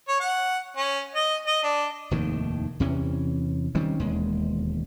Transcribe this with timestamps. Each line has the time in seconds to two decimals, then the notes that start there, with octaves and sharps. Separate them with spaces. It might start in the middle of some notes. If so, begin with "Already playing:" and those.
0.08 C#5
0.20 F#5
0.77 C#4
1.15 D#5
1.47 D#5
1.63 D4
2.11 F1 D#2 A2 D#3
2.80 E2 C3 E3 C#4
3.75 D#3 G3 C4 C#4
4.00 E1 D#2 G#3